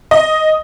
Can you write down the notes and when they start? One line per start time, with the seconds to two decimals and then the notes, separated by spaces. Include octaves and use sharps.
0.11 D#5